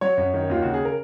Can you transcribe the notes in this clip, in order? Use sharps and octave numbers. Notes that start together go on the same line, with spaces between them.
F#3 C#5
F#2
D#3
D#2 F4
C#3 F#4
G#4
A#4